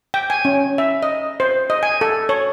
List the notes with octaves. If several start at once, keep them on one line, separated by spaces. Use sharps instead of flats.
G5
G#5
C#4
E5
D#5
C5
D#5
G#5
A4
C#5